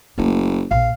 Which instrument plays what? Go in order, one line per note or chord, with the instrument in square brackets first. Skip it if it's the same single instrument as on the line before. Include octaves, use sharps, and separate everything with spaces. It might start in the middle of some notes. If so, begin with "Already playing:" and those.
[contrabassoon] F#1 [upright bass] A3 A#3
[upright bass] A#1 [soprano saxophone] F5